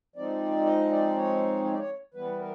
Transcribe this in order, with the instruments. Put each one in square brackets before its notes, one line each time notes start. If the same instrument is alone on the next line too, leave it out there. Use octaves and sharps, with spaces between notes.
[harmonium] F3 G#3 C4 D#4 D5
D#5
D5
C#5
C#5
D5
C#5
E3 G3 B3 B4
A#4